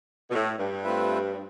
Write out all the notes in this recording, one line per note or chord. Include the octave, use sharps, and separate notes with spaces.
B2
A2
G2
A3 C4 F4 B4 E5